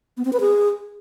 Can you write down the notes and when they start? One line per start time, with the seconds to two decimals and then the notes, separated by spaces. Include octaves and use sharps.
0.17 B3
0.25 C4
0.33 B4
0.40 G#4